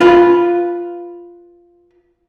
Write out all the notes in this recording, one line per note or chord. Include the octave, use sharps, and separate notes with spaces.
F4 B4